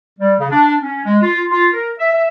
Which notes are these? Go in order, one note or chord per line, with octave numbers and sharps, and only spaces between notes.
G3
C#3
D4
C#4
G#3
F4
F4
A#4
E5
E5